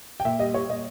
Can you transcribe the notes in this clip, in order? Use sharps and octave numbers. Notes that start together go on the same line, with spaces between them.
G5
A#2 E5
G3 D#5
G3 C#5
A#2 D#5